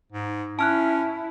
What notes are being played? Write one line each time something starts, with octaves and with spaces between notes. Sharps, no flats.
G#2
C#4 E4 A5 F6 F#6